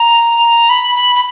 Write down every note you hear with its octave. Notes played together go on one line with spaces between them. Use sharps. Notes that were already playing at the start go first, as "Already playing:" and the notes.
Already playing: A#5
B5
B5
B5